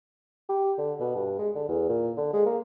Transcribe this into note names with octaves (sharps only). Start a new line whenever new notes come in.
G4
D3
B2
G2
G#3
D3
E2
A#2
D3
G#3
A#3